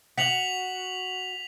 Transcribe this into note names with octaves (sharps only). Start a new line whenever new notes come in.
F#4 B6 F7 F#7